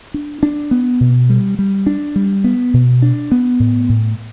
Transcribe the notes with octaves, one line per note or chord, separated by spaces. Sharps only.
D4
D4
B3
B2
G3
G3
D4
G3
B3
B2
D4
B3
A2
A2